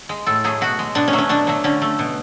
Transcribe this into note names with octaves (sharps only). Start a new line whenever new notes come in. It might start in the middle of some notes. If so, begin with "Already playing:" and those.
G#3
A2 A4
F#3 A3 G#4
B2 F#4
G#3
B2 D4
C#4
F#3 A3
C#4
B2 D4
F#3 A3
D3 C#4
A3
B2